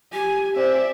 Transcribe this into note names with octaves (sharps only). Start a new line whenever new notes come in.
G4 G#5
C4 D5 E5